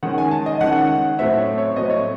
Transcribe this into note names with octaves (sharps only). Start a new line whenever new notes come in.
D#3 G#3 C#4 F#5
G#5
A5
D#5
D#3 G#3 C#4 F#5
A2 F#3 A3 C4 E5
C#5
C#5
A2 F#3 A3 C4 D#5
C#5